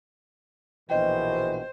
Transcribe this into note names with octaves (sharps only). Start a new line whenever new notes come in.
A#1 B2 E3 C5 D#5 G5